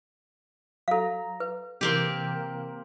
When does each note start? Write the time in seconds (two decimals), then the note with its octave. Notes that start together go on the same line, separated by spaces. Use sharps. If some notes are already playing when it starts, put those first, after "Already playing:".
0.88 F#3 A4 F5 A#5
1.40 B4
1.81 C3 E3 A#3 C4 G4